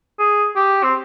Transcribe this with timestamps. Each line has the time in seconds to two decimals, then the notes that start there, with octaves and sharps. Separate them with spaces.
0.19 G#4
0.56 G4
0.84 C4